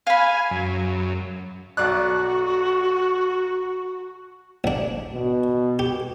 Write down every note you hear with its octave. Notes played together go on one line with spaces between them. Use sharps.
F5 G#5 B5
F#2
B1 F#4 D5 F#6
A1 D4
B2
G4